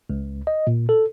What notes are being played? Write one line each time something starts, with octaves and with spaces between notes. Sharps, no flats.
C#2
D#5
A#2
A4